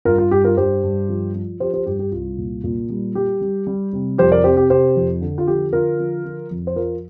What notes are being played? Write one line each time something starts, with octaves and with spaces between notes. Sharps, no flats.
G2 F4 A#4
F4
G2 G4
F4 A#4
G2 G4 C5
G2
F3
F3
F3 G4 C5
G4 C5
G2 G4
G4
C2 F4
A#2
A#2
G3
G3 G4
G3
G3
C3
F2 G4 C5
A#4 D5
C3 G4 C5
G4
C3 G4 C5
F2
D3
F4
F3 G4
D3 F4 A#4
F3
F3
F2
C5
F3 F4 A#4